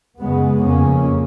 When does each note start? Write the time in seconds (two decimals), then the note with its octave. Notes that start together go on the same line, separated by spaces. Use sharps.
0.20 F#2 C#3 G#3 B3
0.64 F2 C#3 A#3 C#4